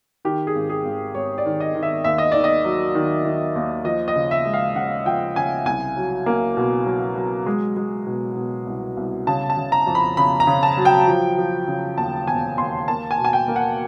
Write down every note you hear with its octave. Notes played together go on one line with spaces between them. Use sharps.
D#3 G4
G#4
G#1
G#4
G#1
G#1 C#5
D5
D#3
D#5
D#3
E5
D#2 E5
D#5
D#3 D5
D#5
F#3
D#3
D#3
D#2
F3 D#5
D#5
C#3
E5
G#3
F5
C#3 F#5
F3 G5
C#3 G#5
C2 G#5
F#3
A#3
B2
F#3
F#3
G#3
G#3
B2
B2
C2
C2
C#3 A5
A5
C#3
A#5
F2
B5
C#3 B5
A#5
C#3
A5
F#3
G5
F3
F3
C#3
D#2 A5
E1 G#5
D#2 C6
A#3 A5
G#5
B2
G#5
G5
A#3
F#5